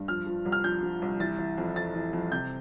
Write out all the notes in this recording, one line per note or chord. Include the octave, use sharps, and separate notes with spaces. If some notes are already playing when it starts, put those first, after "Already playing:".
Already playing: G2
F3 F6
F3
C2
F6
F3 G6
F3
C2
E3 A6
E3
F2
F2 A6
E3
F2
C3 G6